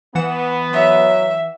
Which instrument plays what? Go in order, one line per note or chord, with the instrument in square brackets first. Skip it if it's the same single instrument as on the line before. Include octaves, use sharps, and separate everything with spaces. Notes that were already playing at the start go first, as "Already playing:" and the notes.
[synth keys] E3 F#5 E7 [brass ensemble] B3
[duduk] F#3 [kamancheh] E5